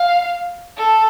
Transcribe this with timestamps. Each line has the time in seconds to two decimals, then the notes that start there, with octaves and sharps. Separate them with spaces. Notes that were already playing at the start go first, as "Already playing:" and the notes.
Already playing: F5
0.77 A4